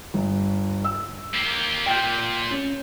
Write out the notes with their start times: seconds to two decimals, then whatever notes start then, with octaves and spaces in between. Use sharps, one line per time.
0.14 G1
0.84 E6
1.34 A#3 G4
1.86 A#2 G5 G6
2.50 C#4